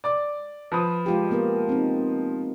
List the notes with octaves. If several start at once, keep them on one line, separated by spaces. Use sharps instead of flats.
D5 D6
F3 B4 D#6
G#3 F4 G4
A#3 B3 A#4
C4 D#4